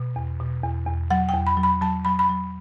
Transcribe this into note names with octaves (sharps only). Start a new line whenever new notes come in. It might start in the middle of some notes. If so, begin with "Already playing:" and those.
Already playing: B2
E2
B2
E2
E2
F#3 F#5
G5
E2
B5
F#3
B5
F#3 A5
F#3 B5
B5
F#3